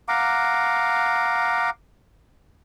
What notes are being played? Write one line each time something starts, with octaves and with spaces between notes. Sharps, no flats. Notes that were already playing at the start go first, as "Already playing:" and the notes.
F5 F#5 A#5 D6